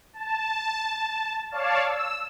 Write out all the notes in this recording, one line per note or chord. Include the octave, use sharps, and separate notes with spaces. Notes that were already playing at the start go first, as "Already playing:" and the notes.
A5
C#5 D5 F5 A5
E6